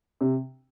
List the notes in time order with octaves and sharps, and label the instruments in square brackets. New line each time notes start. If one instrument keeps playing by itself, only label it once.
[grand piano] C3